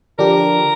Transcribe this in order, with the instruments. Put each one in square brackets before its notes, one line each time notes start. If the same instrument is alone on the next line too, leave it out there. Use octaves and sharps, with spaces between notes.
[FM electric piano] D3 F3 D4 G4 [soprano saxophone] A#4